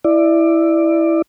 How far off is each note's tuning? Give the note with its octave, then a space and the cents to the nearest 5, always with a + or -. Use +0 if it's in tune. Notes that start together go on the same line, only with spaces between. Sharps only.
E4 +0 D5 +15